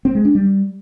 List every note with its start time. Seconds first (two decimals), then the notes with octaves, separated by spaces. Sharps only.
0.05 C4
0.15 G#3
0.25 D4
0.35 G3